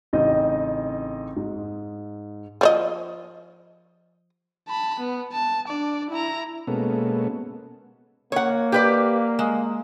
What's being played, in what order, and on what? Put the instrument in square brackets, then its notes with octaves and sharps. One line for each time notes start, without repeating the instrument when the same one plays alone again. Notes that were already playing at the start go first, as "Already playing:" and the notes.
[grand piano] A1 C#3 C4 D#4 D#5
G#2
[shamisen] F3 C#5 D#5
[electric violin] A5 B5
B3
A5
D4 D5
E4 A#5
[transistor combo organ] B2 G#3 A#3 B3 C#4 A4
[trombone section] A#3 [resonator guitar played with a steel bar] C#5 F#5
[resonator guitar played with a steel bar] G4 B4 D5
G#3